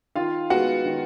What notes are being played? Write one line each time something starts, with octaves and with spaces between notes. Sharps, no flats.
D#3 F4 F5
G#3 B3 F#4 F#5
D#3